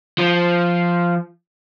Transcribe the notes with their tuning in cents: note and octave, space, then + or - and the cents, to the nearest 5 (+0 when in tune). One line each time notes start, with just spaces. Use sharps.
F3 -5